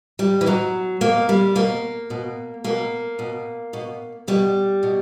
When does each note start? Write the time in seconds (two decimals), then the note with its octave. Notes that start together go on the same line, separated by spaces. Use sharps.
0.19 G3
0.41 E3
0.46 B2 F#3
1.01 B2 A#3
1.29 G3
1.55 B2 A#3
2.10 B2
2.64 B2 A#3
3.19 B2
3.73 B2
4.28 B2 G3
4.83 B2